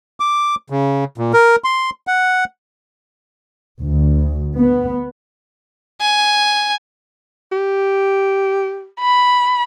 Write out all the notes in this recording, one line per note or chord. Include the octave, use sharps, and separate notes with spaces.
D6
C#3
A#2
A#4
C6
F#5
D2
B3
G#5
G4
B5